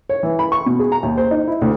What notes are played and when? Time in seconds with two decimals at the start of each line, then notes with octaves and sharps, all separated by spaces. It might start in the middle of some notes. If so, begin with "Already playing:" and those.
0.09 C#5
0.23 E3
0.39 B5
0.52 C#6
0.66 B2
0.79 G#4
0.92 A#5
1.03 D#2
1.18 C5
1.31 D#4
1.48 E4
1.62 D2